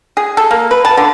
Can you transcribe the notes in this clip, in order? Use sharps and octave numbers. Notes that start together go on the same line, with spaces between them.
G#4
A4
A#3
B4
A5
D3